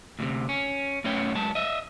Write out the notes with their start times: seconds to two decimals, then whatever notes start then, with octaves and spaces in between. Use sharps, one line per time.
0.19 D2 A2 C3
0.49 C#4
1.04 F#2 A3 B3 C#4 C#5 G5
1.35 F#3 G#3 A5
1.55 D#5 E5